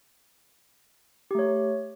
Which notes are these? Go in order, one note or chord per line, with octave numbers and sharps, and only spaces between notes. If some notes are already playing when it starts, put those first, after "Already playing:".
A3 G4 C#5